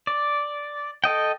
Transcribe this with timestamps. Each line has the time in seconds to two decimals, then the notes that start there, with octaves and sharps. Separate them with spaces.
0.07 D5
1.04 A4 D#5 G5